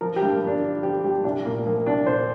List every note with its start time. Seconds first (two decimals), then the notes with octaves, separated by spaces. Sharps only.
0.01 F3 A#4
0.16 G4
0.22 G2
0.32 A#3
0.42 F3 D4
0.63 D3 F4
0.83 F3 G4
1.04 G2 G4
1.24 C2 D4
1.45 A#2 A#3
1.65 F3 A#3
1.86 C2 D4
2.06 A#2 C5